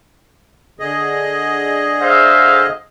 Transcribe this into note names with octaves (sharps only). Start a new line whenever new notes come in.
D3 G#4 D#5
C5 E5 F5